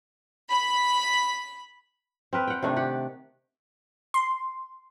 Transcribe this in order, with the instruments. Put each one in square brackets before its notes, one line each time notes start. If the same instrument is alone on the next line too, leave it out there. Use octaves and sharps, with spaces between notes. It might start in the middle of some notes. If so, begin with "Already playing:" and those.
[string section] B5
[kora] C4 A#4 B4
F#5 G5
C3 D#3 A3 D4
G4 F#5
[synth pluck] C6